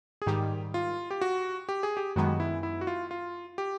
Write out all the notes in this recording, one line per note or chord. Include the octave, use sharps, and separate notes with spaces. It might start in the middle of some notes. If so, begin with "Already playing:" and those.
G#4
G#2 D#3 G3 G4
F4
G4
F#4
G4
G#4
G4
F#2 D#3 G#3 B3 F#4
E4
E4
F#4
F4
F4
G4